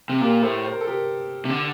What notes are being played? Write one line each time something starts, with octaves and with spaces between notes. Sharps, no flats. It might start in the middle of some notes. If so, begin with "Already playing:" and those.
C3
A#2 G4 A#4
A2 A4 C5
C5
A#4
A4
G4 A#4
C3
D3